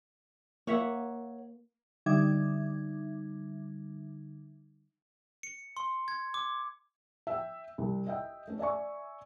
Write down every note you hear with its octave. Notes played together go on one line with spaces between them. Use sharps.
A#3 C#5 E5 F#5
D3 G3 D#4 E5 D6 G#6
C#7
C6
G#6
D6
E5 G5
C2
D#5 E5 G5
A3 C#4
D5 E5 G#5 C#6